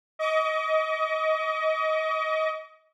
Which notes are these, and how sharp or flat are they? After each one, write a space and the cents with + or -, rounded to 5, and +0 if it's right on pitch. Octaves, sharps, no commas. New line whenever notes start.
D#5 +20 D6 -45